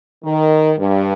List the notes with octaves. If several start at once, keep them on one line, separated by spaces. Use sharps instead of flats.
D#3
G2